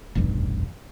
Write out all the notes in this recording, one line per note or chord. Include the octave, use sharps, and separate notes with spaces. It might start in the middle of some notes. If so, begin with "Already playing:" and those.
F1 B1 E2 G2